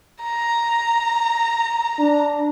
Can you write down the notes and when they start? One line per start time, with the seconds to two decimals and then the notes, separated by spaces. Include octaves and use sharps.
0.23 A#5
1.99 D4